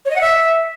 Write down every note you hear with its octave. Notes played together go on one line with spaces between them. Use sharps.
C#5
D#5
F#5
E5